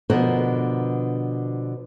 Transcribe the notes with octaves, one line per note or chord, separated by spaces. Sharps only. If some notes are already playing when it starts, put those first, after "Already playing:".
B2 D3 F3 A#4 B4